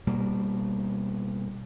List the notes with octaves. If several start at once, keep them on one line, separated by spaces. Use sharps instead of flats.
B2 G3 A#3